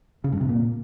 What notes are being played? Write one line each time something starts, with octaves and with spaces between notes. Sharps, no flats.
C#3
G2
C3
A#2